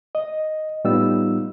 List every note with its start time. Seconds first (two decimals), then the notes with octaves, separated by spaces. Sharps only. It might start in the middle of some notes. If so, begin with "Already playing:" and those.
0.15 D#5
0.84 A2 G3 B3 D#4 F4 E6